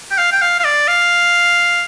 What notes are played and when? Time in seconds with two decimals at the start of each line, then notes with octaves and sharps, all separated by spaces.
0.11 G5
0.18 F5
0.32 G5
0.41 F5
0.60 F5
0.64 D5
0.88 F5